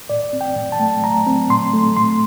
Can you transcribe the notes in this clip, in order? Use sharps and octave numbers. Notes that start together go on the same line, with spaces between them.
A2 D5
C4
G5
A2
A5
A3
A2 A#5
C4
A2 C6
A3
A2 C6